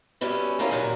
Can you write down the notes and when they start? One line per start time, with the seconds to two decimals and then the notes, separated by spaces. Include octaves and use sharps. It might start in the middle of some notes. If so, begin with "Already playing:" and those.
0.21 F#2 G3 B3 C#4 E4
0.59 F3 G3 A#3 C#4 E4 F4
0.71 D#2 A#2 F#3